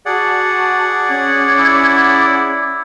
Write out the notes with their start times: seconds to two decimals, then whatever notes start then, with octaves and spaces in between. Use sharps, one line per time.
0.06 F#4 G#4 D5 F#5 A5
1.09 C#4 D6 G#6
1.59 E4